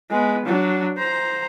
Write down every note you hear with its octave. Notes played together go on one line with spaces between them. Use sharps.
G#3 B3
F#3 D4
C5 A#5